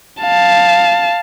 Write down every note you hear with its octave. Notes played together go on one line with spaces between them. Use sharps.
F5 A5